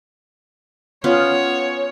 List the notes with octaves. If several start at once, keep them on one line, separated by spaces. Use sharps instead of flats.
B3 C#4 F4 C#5